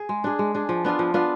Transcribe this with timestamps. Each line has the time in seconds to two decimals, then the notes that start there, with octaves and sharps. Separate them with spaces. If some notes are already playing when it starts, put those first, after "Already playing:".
Already playing: G#4
0.09 G#3
0.24 D4 G#4
0.39 G#3
0.55 D4 G#4
0.69 F3
0.84 B3 D4 F4
0.99 F3
1.14 B3 D4 F4